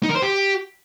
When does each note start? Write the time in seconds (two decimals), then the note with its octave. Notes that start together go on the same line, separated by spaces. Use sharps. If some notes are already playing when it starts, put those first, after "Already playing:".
0.03 D#4
0.09 A#4
0.16 C5
0.22 G4